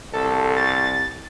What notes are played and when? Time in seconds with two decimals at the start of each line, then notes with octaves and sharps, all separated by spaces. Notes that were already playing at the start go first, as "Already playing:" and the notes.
0.13 C2 A4
0.57 A6